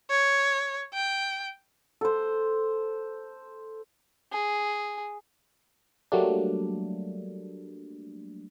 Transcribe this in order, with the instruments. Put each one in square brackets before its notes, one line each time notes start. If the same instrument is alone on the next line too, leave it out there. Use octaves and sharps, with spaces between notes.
[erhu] C#5
G5
[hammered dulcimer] A4 C5
[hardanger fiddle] G#4
[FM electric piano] F#3 G3 A3 A#3 D4